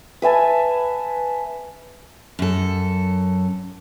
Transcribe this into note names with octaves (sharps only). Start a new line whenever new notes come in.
B4 E5 G#5 A5
F#2 A4